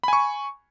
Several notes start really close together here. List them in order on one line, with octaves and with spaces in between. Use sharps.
B5 G#5 C#6